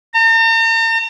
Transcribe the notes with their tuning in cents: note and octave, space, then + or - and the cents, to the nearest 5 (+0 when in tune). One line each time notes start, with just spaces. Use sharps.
A#5 -45